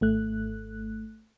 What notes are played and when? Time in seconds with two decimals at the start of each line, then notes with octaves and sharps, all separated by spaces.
0.01 G#1 A3 F#6